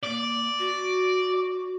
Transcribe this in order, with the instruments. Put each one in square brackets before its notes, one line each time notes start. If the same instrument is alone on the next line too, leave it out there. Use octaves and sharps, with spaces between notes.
[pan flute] A#3 [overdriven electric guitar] D5
[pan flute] F#4